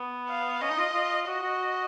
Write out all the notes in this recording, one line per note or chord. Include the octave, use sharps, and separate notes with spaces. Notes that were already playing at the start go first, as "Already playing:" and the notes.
Already playing: B3
F5
C#4 D#5
D#4
F4
F4
F#4 D#5
F#4